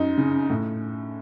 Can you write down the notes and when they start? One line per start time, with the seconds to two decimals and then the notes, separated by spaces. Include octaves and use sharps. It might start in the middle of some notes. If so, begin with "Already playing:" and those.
Already playing: F#2 D#4
0.18 C#3
0.50 A2